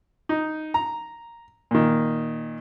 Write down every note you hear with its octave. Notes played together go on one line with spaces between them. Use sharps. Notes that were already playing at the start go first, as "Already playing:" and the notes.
D#4
A#5
A#2 D#3